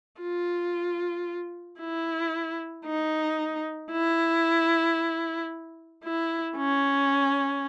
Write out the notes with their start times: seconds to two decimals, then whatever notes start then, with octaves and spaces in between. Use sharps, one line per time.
0.21 F4
1.80 E4
2.86 D#4
3.92 E4
6.04 E4
6.57 C#4